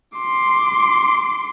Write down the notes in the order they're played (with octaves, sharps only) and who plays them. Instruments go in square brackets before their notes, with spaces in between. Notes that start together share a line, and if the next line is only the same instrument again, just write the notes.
[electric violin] C6 D6